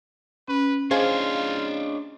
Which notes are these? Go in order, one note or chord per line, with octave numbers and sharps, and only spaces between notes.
C#4 B4
D4 F4 G#4 C5 C#5 D#5 F5